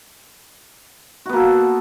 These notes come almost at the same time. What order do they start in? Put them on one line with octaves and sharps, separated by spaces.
F#4 B3 A#3 A4